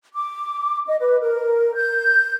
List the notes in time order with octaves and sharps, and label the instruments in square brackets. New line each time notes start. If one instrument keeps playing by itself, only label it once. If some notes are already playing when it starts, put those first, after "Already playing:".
[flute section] D6
D#5
B4
A#4
G6